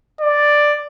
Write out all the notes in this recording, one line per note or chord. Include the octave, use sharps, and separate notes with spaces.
D5